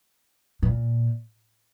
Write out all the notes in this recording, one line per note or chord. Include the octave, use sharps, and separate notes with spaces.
A#2